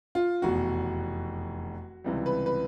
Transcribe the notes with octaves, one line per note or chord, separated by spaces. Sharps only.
F4
F1 E2 B2 F#4
C#2 C3 E3 G3
B4
B4